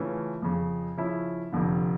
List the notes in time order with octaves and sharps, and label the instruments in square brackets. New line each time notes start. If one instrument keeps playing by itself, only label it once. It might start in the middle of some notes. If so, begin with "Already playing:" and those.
Already playing: [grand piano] C#3 E3 A3 C#4 F4
F2 C#3 F3
C#3 F3 C#4 E4
F1 F2 D3